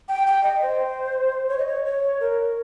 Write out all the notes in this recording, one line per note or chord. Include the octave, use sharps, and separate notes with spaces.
G5
G5
D#5
C5
C#5
D#5
C#5
C#5
A#4